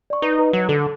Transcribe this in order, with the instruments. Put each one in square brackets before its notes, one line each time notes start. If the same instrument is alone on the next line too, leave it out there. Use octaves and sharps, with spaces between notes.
[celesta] D5 C#6
[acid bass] D#4 [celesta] B4
[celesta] B4
[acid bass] F#3
[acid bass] D3 [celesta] A4